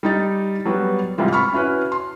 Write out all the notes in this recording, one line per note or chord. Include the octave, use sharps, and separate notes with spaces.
G3 D#4 A6
F#3 G3 B3 F#4
G#2 C3 E3 G3 F4
B5 C#6 F6
C#4 E4 F#4 B4
C6